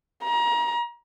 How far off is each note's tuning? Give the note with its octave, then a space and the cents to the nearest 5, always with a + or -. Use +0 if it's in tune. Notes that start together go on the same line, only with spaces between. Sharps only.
A#5 +30